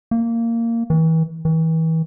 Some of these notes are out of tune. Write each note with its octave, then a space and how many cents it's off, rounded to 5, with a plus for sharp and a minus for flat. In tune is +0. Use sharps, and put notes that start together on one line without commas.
A#3 -15
E3 -35
E3 -35